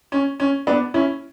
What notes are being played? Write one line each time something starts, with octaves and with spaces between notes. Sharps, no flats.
C#4
C#4
B3 D4
C#4 E4